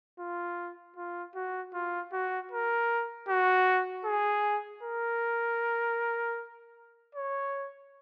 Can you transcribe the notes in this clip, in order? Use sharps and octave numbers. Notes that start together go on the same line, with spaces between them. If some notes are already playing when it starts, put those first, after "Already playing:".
F4
F4
F#4
F4
F#4
A#4
F#4
G#4
A#4
C#5